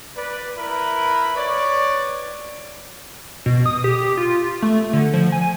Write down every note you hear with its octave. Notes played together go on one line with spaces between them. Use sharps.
B4 D5
E4 A#4 B4 B5
B4 C#5 D5
B2
D#6
G4
F4
A3
D3
F3
G#5